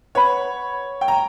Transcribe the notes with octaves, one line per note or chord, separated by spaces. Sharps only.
B4 C#5 F#5 B5
G5
A#5